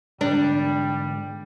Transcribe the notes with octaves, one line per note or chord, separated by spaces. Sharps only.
G#2 D3 G3 G#3 D4